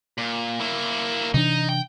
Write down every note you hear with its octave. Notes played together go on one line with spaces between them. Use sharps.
A#2
A#3 E4
C3 E3 D4 D#4
G5